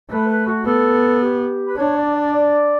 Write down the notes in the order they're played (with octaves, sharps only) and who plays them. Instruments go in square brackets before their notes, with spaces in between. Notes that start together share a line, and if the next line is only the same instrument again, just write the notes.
[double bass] A3 [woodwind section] B4
[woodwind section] B4
F#4
[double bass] B3 [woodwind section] A4
[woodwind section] G4
B4
[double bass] D4 [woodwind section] C#5
[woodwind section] D5
D5
D5